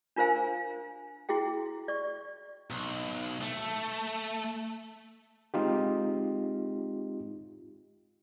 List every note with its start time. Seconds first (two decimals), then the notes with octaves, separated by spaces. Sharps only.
0.16 D4 F4 A#4 C5 F5 G#5
1.29 E4 F#4 G#4 G5
1.88 D5 C#6
2.70 B1
3.42 A3
5.54 G#3 C4 D#4 F4 G4